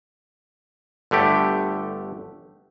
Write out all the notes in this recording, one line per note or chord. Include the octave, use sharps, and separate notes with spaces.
G1 D3 A3 G4